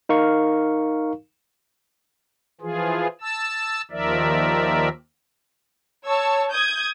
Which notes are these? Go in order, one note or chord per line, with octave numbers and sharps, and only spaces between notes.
D#4 A#4 F5 C#6
E3 F3 F4 G#4
A5 E6
D#2 D#3 F3 A#4 D5 E5
C#5 A5 E6
D#6 G6 G#6